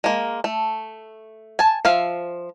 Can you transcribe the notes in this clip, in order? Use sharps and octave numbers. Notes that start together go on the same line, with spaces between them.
G#3 A#3
A3
G#5 A5
F3 E5 F5